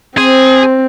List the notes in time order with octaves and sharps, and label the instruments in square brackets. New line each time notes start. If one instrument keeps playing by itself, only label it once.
[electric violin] C4 [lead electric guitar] G#4 [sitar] C5